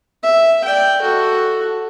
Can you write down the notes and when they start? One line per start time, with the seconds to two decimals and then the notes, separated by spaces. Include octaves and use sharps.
0.23 E5
0.64 D5 G5
1.01 F#4 A4